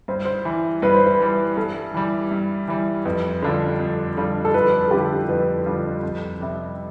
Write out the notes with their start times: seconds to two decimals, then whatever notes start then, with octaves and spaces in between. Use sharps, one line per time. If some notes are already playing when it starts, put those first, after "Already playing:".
0.08 G2 C5
0.25 C5
0.45 E3 G3
0.82 G2 B4
0.94 C5
1.06 B4
1.19 E3 G3
1.57 G2 A4
1.94 E3 G3
2.31 G2
2.68 E3 G3
3.05 F2 B4
3.42 D3 G3 D4 F4
3.79 F2
4.17 D3 G3 D4 F4
4.45 A4
4.54 F2 B4
4.88 A4
4.91 D3 G3 D4 F4 G4
5.29 F2 B4
5.66 D3 G3 D4 F4
6.03 F2
6.40 C3 G3